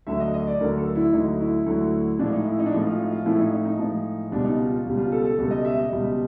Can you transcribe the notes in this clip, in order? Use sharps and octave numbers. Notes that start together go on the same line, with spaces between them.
D2 D3 F#3 E5
D#5
D#5
D5
D2 D3 F#3 A#4
A4
E4
D2 D3 F#3 D#4
E4
D2 D3 F#3
A2 F3 G#3 D4
D#4
E4
D#4
D4
A2 F3 G#3 D#4
F4
D#4
F4
A2 F3 G#3 E4
D#4
D#4
D#4
A2 F3 G#3
C#2 B2 G3 D4
D#4
F4
F4
C#2 B2 G3
F4
A4
A4
C#2 B2 G3 A4
D#5
E5
D#5
C#2 B2 G3